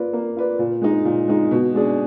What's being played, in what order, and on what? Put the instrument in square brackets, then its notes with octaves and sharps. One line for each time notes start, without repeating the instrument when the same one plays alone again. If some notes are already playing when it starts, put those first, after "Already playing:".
Already playing: [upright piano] A#3 F4 B4 D5
A#3
F4 B4 D5
A#2
G#3 D#4
A#2
G#3 D#4
B2
G#3 D4 G#4